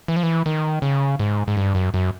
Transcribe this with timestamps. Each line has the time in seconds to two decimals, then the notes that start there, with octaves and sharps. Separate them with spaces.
0.08 E3
0.16 F3
0.23 E3
0.46 D#3
0.82 C#3
1.19 G#2
1.48 G#2
1.57 G2
1.75 F#2
1.94 F#2